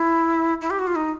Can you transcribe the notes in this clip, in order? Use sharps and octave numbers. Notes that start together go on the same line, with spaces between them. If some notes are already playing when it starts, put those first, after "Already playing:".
Already playing: E4
E4
G4
F#4
F4
D#4